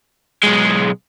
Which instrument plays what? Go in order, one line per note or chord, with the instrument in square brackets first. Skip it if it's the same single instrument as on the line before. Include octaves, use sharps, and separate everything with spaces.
[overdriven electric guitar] B1 G#3